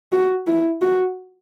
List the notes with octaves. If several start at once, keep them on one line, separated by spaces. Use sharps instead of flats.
F#4
E4
F#4